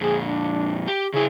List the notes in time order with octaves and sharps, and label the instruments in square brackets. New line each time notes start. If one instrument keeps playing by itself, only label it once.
[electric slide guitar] F2 A#2 [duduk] G#4
[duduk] D4
[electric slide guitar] G4
[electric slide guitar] C#3 E4 [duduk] G#4